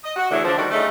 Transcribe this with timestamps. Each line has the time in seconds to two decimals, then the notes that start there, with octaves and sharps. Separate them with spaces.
0.04 D#5
0.16 F#4
0.30 D3 E3 F#3 A3 E4 G#4
0.45 D3 F3 D4
0.57 D#3 G3 A3 F#4 D5
0.71 C#3 A3 D#4